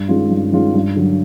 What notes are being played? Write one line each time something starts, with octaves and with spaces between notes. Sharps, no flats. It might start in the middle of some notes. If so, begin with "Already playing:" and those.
Already playing: G2
D#3 G#3 C#4 F4
G2
D#3 G#3 C#4 F4
G2
D3 F#3